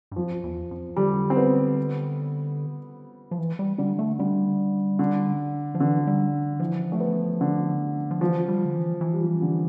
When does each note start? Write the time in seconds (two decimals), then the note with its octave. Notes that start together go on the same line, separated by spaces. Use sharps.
0.12 G2
0.16 F2 F3
0.44 E2
0.71 F2
0.96 D3 G3
1.30 C4
1.37 B3
3.31 F3
3.38 E3
3.59 G3
3.78 D3 G3
3.99 A3
4.19 D3 G3
4.99 D3
5.75 F3
5.80 D3 E3
6.07 G3
6.60 E3 F3
6.92 A3
7.00 B3
7.41 D3
8.11 F3
8.21 E3 F3
8.48 G3
8.65 D3
8.75 E3
9.01 E3
9.13 G3
9.21 F3
9.42 D3